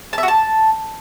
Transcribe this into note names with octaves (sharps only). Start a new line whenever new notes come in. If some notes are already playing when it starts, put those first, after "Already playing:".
A5
E5
F#4
A5